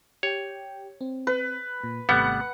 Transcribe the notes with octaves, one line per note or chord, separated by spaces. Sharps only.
G4 C#5 G5
C4
B4
A#2
G#1 C3 G3 A3 B3 F#5